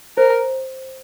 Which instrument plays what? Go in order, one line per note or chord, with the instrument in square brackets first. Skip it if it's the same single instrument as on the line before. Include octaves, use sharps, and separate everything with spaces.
[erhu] A#4 [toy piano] C5